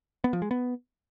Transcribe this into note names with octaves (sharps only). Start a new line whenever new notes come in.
B3
F3
G#3
B3